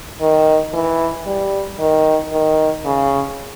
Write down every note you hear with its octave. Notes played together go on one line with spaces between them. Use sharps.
D#3
E3
G3
D#3
D#3
C#3